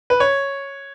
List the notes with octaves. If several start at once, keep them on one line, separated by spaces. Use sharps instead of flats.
B4
C#5